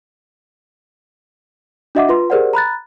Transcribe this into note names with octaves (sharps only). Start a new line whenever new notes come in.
D4 F#4 D#5 E5 F#5 D6
F4 B4 C6
G4 G#4 A#4 C5 D5 F#5
A#5 B5 F#6 A6